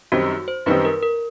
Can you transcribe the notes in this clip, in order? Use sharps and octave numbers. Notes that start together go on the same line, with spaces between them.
F#2 D#3 G3 C4 D#4 F#4
C5
F#2 D#3 G3 C4 D#4 B4
A#4
A#4